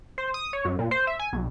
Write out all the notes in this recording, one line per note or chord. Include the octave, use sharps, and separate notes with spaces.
C5
D#6
C#5
F#2
A#2
C5
E5
G#5
B1